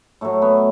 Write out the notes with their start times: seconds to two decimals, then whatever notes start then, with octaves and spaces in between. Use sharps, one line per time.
0.21 A2 F#3 A3
0.42 B3